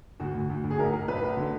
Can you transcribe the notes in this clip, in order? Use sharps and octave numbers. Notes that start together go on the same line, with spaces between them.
D2 F#4
D2
D2
D2
G#4
B1 A#4
B1 A#4
B1 B4
B1
D3